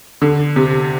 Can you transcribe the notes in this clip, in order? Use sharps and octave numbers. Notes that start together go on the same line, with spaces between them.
D3
C3